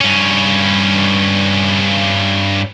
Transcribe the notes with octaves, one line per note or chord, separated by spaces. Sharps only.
G2 C#4